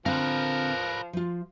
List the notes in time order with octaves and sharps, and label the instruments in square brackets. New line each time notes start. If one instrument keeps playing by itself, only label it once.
[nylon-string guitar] D3 C4 F5 [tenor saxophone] F3 [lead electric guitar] A#4 B4
[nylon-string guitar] F3 F4